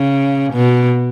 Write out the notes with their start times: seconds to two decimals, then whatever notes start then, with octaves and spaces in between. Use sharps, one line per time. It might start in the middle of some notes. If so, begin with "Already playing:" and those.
Already playing: C#3
0.53 B2